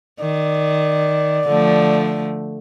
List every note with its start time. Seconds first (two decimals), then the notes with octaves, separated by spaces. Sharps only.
0.20 D#3 D5
1.48 D3 F3 A3